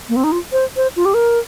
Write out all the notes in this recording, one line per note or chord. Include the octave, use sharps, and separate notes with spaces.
A#3
C4
D#4
F4
C5
C5
F4
G4
A#4